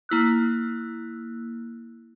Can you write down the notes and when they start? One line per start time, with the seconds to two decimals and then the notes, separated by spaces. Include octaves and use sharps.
0.09 A#3 E4 E6 F#6